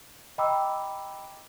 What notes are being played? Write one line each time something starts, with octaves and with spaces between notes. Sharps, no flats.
D#5 G5 A#5 B5 D6 E6